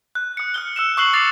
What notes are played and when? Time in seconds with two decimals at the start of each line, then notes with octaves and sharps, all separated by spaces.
0.15 F#6
0.37 D#6 C#7
0.54 F6 F#6 G7
0.76 E6 C#7 E7
0.97 C#6 D#6 F#6 C7 F#7 G7
1.13 D6 A6 C7 C#7 F7